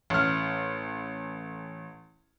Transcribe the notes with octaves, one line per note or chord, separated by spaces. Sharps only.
A1 F6